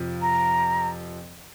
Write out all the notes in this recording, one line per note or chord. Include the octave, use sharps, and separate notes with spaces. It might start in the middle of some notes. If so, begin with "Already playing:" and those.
Already playing: F2 C3 F3
A#5